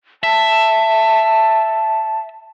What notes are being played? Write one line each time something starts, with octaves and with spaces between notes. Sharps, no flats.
E5 A5